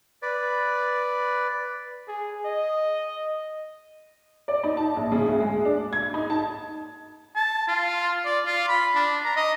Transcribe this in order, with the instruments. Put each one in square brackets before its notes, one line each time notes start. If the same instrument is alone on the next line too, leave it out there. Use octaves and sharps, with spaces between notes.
[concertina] B4 D5
[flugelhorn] G#4
D#5
[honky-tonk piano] D5
D#4
A5
A#1
C#3
D2
G#3
D4
G#6
D#4
A5
[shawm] A5
F4
D5
F4
B5
D4
A#5
D#5